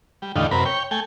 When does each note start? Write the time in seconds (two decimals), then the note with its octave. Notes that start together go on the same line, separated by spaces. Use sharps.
0.22 G3
0.36 E2 A2 D3 G3 D#4 F4
0.51 F#2 C3 A#4 B4 B5
0.65 C#5 G5
0.91 A3 G5 G#5